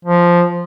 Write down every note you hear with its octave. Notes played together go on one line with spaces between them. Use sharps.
F3